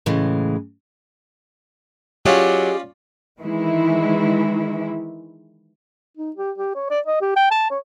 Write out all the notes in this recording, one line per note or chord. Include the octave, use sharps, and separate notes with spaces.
A2 C#3 E3 G#3
F#3 C#4 F4 G4 G#4 D5 D#5
D#3 E3 G#3 E4
D#4
G4
G4
C#5
D5
D#5
G4
G5
A5
C#5